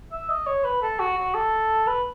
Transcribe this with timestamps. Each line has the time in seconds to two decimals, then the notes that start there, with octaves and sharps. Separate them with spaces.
0.12 E5
0.29 D#5
0.47 C#5
0.64 B4
0.82 A4
0.99 F#4
1.17 F#4
1.35 A4
1.87 B4